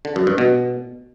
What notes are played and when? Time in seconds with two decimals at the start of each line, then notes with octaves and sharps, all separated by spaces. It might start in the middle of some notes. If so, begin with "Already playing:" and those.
0.05 D3
0.16 F#2
0.27 G2
0.38 B2